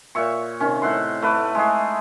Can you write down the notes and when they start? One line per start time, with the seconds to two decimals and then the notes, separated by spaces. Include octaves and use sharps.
0.15 A#2 C#5 E5 C#6
0.60 C3 D#3 C#4
0.82 A2 E5 F#5 C6
1.22 A3 B4 D6
1.55 G#3 A3 G#4